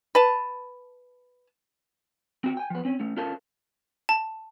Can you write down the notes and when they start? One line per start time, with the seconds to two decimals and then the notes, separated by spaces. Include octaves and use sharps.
0.15 B4 A5
2.44 C4 F#4 G5
2.57 G5 G#5
2.70 F3 B3
2.85 C4 C#4
3.00 A3 C#4
3.17 C#4 F4 A4 A#4 F5 A5
4.09 A5